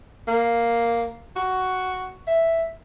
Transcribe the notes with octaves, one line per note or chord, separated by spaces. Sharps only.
A#3
F#4
E5